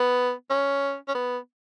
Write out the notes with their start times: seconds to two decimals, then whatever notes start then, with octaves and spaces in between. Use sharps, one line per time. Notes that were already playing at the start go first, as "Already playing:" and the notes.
Already playing: B3
0.50 C#4
1.08 C#4
1.15 B3